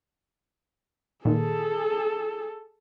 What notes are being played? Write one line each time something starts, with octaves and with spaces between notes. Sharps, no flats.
A#2 D#3 G#4 A4